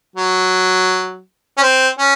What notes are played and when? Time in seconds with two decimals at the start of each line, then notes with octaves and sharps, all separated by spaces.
0.16 F#3
1.58 C#4
1.63 C4
1.99 C#4